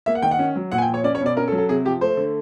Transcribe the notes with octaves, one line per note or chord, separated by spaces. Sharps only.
A#3 E5
F#5
D#3 G5
F#5
C#4
F#3
A#2 F#5
G#5
G5
F3
C#5
C#4 D5
C#5
B2
D5
C#4 A#4
A4
F#3
A4
C3 G#4
F3 G4
A3 C5
D3